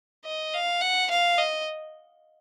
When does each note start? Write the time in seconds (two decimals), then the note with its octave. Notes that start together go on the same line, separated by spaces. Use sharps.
0.25 D#5
0.53 F5
0.81 F#5
1.10 F5
1.38 D#5